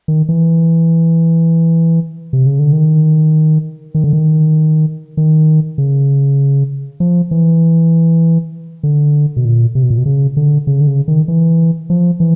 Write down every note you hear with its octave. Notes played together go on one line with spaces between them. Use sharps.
D#3
E3
C3
C#3
D3
D#3
D#3
D3
D#3
D#3
C#3
F3
E3
D3
B2
A#2
C3
B2
A#2
B2
C#3
D3
C#3
D3
C#3
D#3
E3
F3
E3